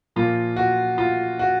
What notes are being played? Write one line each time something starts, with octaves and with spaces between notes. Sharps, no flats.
A#2 F3 A#3 F4
F#4
F4
F#4